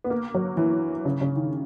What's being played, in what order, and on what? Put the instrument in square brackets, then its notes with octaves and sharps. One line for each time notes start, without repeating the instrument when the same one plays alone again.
[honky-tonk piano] B3
A#3
F#3
E3
C#3
C#3
D#3